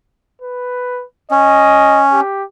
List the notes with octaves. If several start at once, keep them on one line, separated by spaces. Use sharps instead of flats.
B4
C#4 D#5
G4